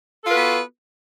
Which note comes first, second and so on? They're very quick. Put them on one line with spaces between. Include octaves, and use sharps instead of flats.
A4 F4 B4 F#4 B3